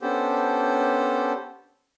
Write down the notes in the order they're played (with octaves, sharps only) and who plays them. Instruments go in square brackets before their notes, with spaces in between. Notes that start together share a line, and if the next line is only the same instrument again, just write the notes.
[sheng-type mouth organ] B3 C#4 D4 G4 A4 C5